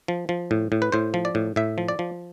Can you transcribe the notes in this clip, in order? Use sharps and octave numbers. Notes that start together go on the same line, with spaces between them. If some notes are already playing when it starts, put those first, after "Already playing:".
F3
F3
A2
A2
B4
A2 C5
F3
D5
A2
A2 E5
F3
D5
F3